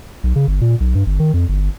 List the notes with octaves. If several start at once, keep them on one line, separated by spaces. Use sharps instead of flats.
B1
C#3
G1
A#2
B1
G2
G1
D#3
F2
G1